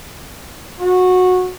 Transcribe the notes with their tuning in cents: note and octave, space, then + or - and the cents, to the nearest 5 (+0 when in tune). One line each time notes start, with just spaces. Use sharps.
F#4 -15